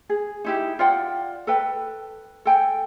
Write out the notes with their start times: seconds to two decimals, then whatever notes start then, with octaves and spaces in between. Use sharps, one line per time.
0.09 G#4
0.44 D#4 E4 G4
0.79 F4 D5 F#5 G5
1.47 A4 B4 G5
2.45 A4 G5 G#5